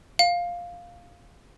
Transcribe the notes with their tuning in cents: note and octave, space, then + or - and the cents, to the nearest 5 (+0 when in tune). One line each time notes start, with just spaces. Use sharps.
F5 +5